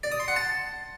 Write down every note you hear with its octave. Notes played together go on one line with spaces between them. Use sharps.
D5
D#6
C6
F#5
A5